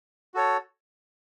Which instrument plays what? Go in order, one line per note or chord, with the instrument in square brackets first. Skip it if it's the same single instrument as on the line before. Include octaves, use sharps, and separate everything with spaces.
[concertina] F#4 A4 C#5